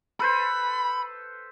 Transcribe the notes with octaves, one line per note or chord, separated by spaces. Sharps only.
A4 B4 C5 B5